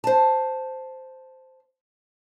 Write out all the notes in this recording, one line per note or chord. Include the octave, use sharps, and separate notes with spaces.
C5 A5